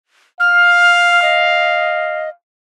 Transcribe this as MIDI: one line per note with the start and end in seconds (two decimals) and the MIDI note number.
0.40 2.32 77
0.40 1.20 89
1.22 2.29 75